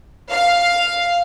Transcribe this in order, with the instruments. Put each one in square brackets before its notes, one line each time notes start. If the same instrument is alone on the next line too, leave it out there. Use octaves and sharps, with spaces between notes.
[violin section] F5